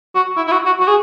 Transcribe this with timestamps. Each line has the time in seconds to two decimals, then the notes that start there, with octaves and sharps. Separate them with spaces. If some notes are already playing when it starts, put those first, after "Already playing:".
0.15 F#4
0.37 E4
0.48 E4
0.52 F#4
0.66 F#4
0.80 F#4
0.88 G#4